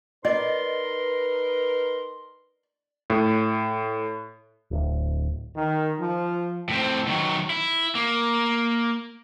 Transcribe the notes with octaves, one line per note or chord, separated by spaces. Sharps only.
D#4 A#4 B4 D5 D#5 C6
A2
D1
D#3
F3
A2 C4
D#3 F#3
E4
A#3